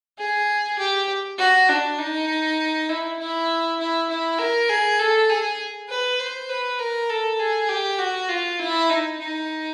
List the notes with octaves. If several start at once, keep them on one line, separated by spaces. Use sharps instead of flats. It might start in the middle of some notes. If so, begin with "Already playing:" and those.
G#4
G4
F#4
D4
D#4
E4
E4
E4
E4
A#4
G#4
A4
G#4
B4
C5
B4
A#4
A4
G#4
G4
F#4
F4
E4
D#4
D#4